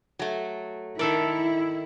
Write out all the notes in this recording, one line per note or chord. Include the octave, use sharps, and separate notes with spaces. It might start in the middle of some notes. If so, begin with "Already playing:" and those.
F#3 A3
D#3 E4 A4 A#4 D5